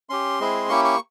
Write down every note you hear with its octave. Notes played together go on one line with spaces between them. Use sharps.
C#4 G4 C6
G#3 C4 E4 G#4
A#3 C#4 E4 G4 C#6
C#6